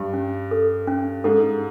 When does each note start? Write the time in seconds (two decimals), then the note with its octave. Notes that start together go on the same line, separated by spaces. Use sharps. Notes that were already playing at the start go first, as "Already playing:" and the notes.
Already playing: G2
0.13 C#4
0.51 A4
0.87 C#4
1.24 G#2 A4